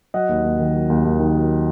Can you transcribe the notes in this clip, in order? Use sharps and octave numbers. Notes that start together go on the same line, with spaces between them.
F#3 D#5 F#5
D#2
D#2
D#3
F#3
D#2
D#2
D#3
F#3